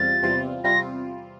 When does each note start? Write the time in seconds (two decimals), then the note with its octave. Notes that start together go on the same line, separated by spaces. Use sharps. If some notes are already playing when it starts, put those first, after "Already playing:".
Already playing: E2 C3 G3 C4 F4 A6
0.23 E2 C3 G3 C4 F4
0.64 C3 G3 C4 F4 A#6